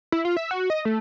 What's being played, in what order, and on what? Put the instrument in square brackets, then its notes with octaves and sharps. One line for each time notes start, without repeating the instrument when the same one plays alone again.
[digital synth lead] E4
F4
E5
F#4
D#5
A3